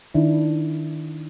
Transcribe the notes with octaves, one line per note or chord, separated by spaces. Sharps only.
D#3 D4 E4